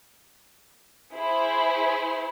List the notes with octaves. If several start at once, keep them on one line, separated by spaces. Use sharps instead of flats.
E4 G#4 C5